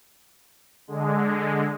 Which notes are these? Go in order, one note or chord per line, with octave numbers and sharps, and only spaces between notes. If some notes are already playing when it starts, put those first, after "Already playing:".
D3 G#3